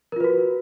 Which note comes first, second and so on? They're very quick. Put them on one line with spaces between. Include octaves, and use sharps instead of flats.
A#4 F4 B4 F#4